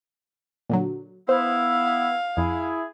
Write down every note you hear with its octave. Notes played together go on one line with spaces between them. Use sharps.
A#2 D3 F#3
B3 E4 C5 F5
F2 E4 G#4